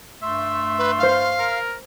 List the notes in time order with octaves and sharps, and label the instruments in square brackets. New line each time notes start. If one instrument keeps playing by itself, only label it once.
[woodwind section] G2 A3 C6 [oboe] E5
[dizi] B4
[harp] C5 F6 [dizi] F5
[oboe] A#4